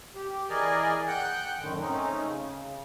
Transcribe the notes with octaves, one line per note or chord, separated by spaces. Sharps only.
G4
E3 G#4 A#4 D5 D#5 G#5
F#5 G5 F#6 G6
F#2 A2 D3 D#3
A3 C4 C#4 D#4
C#3